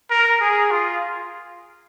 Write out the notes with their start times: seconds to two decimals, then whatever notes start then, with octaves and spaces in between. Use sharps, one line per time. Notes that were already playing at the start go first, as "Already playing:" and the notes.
0.11 A#4
0.41 G#4
0.71 F4